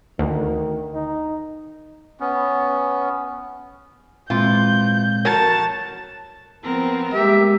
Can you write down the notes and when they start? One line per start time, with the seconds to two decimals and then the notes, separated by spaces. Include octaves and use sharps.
0.19 D2 D#3
0.94 D#4
2.20 B3 C#4
4.30 F#2 A#2 E3 G#3 C4 F4 G6
5.25 F#4 A#4 C#5 A5
6.63 F3 B3 C4 A#4
7.13 G3 G#3 A#3 G4 E5